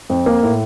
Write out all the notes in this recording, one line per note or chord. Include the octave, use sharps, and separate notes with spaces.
F2
A#3
A2